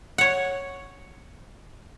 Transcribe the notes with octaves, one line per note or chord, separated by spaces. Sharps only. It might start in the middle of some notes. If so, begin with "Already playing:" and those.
C#5 F#5